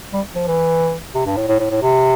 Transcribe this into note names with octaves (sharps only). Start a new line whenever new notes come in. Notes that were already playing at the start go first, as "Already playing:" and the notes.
G3
F3
E3
C3
G2
A2
A2
A2
A2
C3